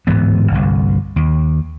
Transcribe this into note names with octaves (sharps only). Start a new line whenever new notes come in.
D1 G#2 E3 B3
G1 C2
D#2